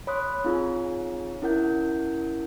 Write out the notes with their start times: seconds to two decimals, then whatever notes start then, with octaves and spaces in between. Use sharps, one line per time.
0.07 C#5 B5 C6 D#6 F#6
0.44 C4 D#4 F4 G#4 C#5 E6
1.42 C#4 E4 A#4 F#5 G6